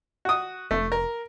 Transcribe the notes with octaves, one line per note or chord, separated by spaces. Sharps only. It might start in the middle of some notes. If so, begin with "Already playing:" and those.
F#4 D#6
F1 A3
A#4